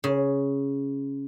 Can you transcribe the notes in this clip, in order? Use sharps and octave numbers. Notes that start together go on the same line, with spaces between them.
C#3